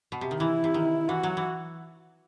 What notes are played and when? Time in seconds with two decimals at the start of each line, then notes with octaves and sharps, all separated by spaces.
0.12 B2
0.21 C3
0.31 D#3
0.39 E3 E4
0.64 C3
0.74 D#3
1.09 E3 F#4
1.23 F#3
1.37 E3